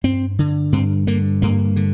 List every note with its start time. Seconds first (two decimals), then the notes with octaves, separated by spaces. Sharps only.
0.04 G2 C4
0.39 D3
0.72 G2 C4
1.07 D3 A#3
1.42 G2 A#3
1.76 D3